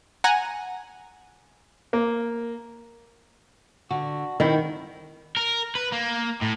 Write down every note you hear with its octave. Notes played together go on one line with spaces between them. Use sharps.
F#5 G#5 A#5
A#3
D3 F#4
D#3 C4 E4
A#4
B4
A#3
A2